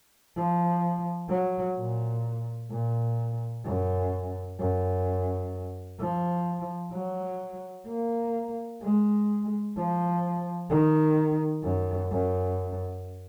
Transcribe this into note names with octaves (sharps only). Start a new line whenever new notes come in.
F3
F#3
A#2
A#2
F#2
F#2
F3
F#3
A#3
G#3
F3
D#3
F#2
F#2